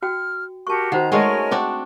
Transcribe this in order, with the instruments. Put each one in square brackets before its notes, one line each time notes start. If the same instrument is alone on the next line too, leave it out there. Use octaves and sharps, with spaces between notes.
[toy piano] F#4 G5 [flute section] F6
[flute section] F#4 G4 A#4 [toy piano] A5 C#6
[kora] D#3 [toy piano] F#4 C5 F#5 [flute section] A#5
[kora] G#3 A3 C#4 [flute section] A#4 C#5 G#5 [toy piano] D#5 F#5
[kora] C4 D4 F#4